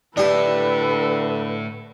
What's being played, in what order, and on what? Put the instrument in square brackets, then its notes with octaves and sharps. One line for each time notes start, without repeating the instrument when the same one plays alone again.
[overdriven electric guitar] A2 E4 [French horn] D3 [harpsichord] D4 G4 [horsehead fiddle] A4 B4